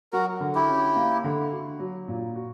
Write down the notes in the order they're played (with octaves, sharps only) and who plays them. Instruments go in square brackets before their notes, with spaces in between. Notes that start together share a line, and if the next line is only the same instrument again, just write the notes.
[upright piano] F#3 [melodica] F#4 A#4
[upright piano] D3
[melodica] E4 G4
[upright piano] C#4
A#3
D3
F#4
F#3
A#2
F#4